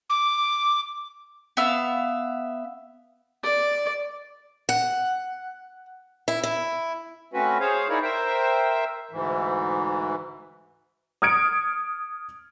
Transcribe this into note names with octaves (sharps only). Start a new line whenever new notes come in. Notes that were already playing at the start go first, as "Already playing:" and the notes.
D6
B3 E5 F5
D5
F#5
E4
E4
A3 C4 C#4 F#4 B4
G#4 C5 C#5 F5
D#4 E4 G#4 A#4 C#5 D5
A#4 C5 E5 G5
D2 G#2 E3
D#6 F6 G#6 C#7 D7